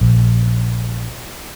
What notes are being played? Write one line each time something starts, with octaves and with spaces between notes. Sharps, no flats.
A#1